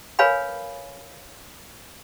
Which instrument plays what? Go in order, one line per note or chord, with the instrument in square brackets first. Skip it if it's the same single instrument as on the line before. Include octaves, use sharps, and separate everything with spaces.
[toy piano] A#4 B4 C#5 F5 G#5 B5